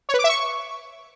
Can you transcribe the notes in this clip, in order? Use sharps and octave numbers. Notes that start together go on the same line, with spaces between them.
C#5
B4
D6
E5
C#6